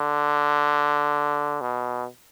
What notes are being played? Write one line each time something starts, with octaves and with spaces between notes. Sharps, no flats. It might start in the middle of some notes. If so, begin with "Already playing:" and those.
Already playing: D3
B2